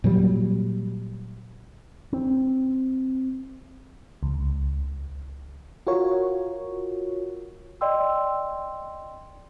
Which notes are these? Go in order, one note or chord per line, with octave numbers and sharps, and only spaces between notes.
A#2 F#3 G3
C4
C#2
F4 F#4 A#4 C#5
D5 D#5 G5 C6 E6